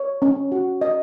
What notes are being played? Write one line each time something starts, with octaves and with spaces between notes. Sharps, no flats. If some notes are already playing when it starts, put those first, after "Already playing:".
Already playing: C#5
C#4
F#4
D#5